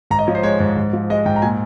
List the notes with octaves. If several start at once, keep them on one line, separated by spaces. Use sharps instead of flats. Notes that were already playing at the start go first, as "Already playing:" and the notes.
G#2 A#5
D#5
F3 C#5
C5
G#3 C#5
G#2 C#5
G#2
F3
G#3 D#5
G#2 G5
A#5
A#2 G#5